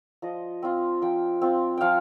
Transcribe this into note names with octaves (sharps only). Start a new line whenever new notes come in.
F3 D#5
C4 F4
F3 G5
C4 F4
F3 F5 G5